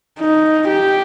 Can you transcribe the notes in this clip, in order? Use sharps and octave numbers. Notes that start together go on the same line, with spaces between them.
D#4
G4